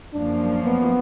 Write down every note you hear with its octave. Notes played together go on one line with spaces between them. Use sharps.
F#2 F3 A#3 D4
B3